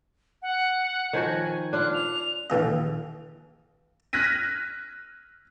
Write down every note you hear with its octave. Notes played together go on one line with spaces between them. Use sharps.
F#5
D#3 F3 F#4 G#5
D4 F4 F#5 F#6
F7
A#1 D#2 E3 D#5
F6 F#6 G#6 A#6 B6 D#7